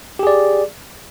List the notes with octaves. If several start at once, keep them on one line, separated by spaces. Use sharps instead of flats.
G4 G#4 D5